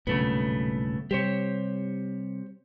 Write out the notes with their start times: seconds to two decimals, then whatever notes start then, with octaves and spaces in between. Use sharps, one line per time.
0.07 B1 G2 A#2 C#3 A3 B3
1.11 C3 G3 G4 C5 C#5